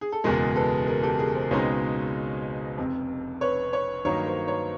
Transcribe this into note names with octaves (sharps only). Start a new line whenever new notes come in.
G#4
A4
F#1 E2 B2 G#3 G#4 A#4
A4 B4
G#4 A#4
G4 A4
G#4 A#4
A#4 C5
C#2 B2 G#3 C4 D#4 B4 C#5
F1 F2 C3
B4 C#5
B4 C#5
G2 D#3 F#3 A#3 D#4 B4 C#5
A#4 C5
B4 C#5